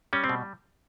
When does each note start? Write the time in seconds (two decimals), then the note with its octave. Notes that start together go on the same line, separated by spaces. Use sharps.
0.13 G3 C#4
0.24 C4
0.29 B2